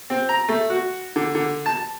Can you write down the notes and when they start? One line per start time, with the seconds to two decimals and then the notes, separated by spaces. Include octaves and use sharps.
0.10 C4
0.29 A#5
0.48 A3
0.70 F#4
1.16 D3
1.35 D3
1.66 A5